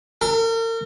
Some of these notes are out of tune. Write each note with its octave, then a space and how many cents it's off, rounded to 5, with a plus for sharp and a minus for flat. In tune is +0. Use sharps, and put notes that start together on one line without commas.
A#4 -40